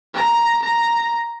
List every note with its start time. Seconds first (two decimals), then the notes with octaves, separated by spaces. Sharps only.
0.14 A#5
0.62 A#5